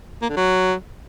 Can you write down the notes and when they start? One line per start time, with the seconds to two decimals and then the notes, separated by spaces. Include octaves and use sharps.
0.22 A#3
0.30 D3
0.37 F#3